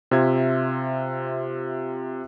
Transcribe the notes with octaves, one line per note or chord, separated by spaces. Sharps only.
C3 F4 E5 G#6